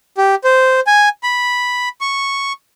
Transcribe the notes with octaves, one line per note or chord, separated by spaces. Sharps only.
G4
C5
G#5
B5
C#6